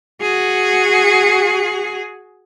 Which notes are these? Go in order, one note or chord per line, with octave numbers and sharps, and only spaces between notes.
F#4 G#4